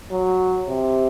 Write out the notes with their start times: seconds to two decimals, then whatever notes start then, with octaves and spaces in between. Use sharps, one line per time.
0.11 F#3
0.69 C3